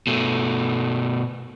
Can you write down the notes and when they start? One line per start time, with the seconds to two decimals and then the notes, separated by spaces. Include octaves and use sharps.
0.07 B2 A3